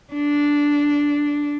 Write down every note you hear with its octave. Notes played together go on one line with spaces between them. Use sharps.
D4